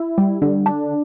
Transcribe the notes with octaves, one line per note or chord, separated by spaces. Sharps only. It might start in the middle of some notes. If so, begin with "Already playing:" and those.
Already playing: E4
G3
D3
D4